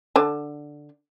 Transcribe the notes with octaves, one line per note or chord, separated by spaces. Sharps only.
D3 A5